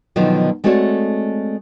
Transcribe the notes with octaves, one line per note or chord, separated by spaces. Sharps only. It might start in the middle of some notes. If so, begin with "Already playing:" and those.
B2 D3 D#3 F3 F#3
G#3 A3 C4 F#4 C#5 D5